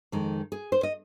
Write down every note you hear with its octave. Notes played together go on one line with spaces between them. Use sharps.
F2 D#3 G#3
G#4
C5
D#5